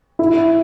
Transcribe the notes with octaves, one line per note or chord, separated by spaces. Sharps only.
E4